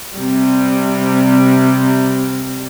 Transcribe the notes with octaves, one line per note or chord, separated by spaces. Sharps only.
C3 G3